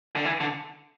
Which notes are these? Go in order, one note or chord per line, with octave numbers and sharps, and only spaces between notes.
D3
E3
D3